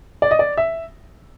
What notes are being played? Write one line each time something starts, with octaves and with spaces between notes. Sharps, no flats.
D5
D#5
D5
E5